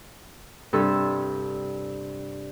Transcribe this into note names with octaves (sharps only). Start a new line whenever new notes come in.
G2 C3 A4 E6